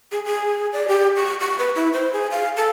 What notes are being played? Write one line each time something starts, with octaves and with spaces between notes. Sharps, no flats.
G#4
G#4
D5
G4
C#6
C#6
B4
E4
C5
G#4
F5
A4